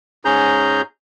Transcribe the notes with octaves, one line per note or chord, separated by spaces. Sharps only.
G#2 C#4 G#4 A#5 G6